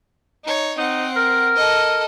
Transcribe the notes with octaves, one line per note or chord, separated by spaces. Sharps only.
D#4 C#5
C4 D#4 F#5
A#4
A4 D#5